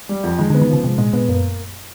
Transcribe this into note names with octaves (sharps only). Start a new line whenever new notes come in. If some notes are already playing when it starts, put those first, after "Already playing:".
G3
F2
D#3 G#3
D3 B3
D#3
C#3 F3
G#2 C3
A#2 G#3
A#2 B3
F#2 A#3